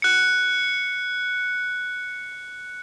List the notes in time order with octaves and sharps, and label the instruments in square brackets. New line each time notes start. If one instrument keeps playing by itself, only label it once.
[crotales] F#6 C#7